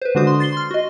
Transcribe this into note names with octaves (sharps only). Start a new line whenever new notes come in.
B4 C5
D3 G#3 D4 F#4 C5 D#6
C6
A6 C7 G7
C6 F6
F#4 D#5